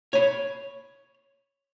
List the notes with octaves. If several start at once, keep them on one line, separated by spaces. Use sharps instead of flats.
C#5 B5